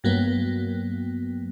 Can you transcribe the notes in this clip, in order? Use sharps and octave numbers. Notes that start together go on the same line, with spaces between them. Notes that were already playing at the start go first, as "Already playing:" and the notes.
G2 F#3 A#3 B3